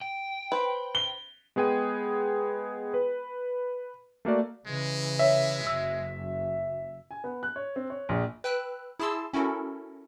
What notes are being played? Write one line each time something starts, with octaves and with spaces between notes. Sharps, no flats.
G5
B4 C5
G7
G#3 B3 G#4 G5 D#7
B4
A3 A#3 F#4 D5
C#3 E3 G#3
C#5 E5
F#1 F#2 E6
G#5
B3
F#6
C#5
C4
C#5
A#1
B4 G5 E6 F#6
E4 G#4 A5 C6 E6
C#4 E4 F#4 A4 A#4